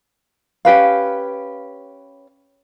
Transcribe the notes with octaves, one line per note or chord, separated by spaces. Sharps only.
C#4 G4 B4 F5